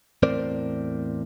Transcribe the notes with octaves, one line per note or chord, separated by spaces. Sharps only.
E2 A2 C4 A#4 C5 D5